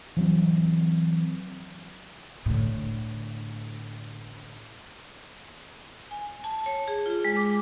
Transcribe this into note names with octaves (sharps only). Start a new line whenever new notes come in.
E3 F#3 C4
A2 D3
G#5
A5
C#5
G#4
F4
G#3
D6